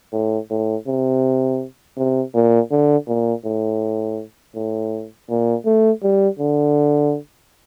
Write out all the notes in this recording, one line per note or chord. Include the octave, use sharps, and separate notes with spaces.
A2
A2
C3
C3
A#2
D3
A#2
A2
A2
A#2
A3
G3
D3